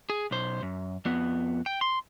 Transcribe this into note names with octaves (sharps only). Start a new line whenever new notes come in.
G#4
B1 C5
F#2
F2 B3
G5
C6